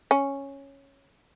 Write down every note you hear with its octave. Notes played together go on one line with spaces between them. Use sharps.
C#4